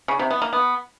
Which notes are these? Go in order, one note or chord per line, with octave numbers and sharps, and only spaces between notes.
C#3
C3
B3
A#3
B3